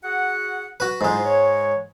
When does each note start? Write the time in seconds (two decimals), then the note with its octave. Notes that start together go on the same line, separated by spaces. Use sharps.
0.02 F#4 G#4 F#5
0.80 F#4 B4
1.01 G#2 G#3 E4 F4 C5
1.25 C#5